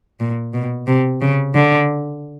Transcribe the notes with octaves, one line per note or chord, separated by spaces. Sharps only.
A#2
B2
C3
C#3
D3